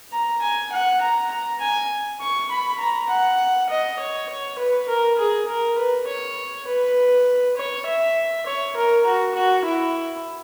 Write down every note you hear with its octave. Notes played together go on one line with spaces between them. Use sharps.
A#5
G#5
F#5
A#5
A#5
G#5
C#6
B5
A#5
F#5
D#5
C#5
C#5
B4
A#4
G#4
A#4
B4
C#5
B4
C#5
E5
C#5
A#4
F#4
F#4
E4